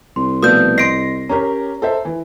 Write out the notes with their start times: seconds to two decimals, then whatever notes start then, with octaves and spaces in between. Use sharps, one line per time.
0.16 C2 C6
0.43 B2 F3 A3 B4 D5 D#6 G6
0.78 D#5 C6 A#6 C7 D7
1.29 C#4 G4 A#4 C#5 A#5
1.82 A4 C5 E5
2.05 E3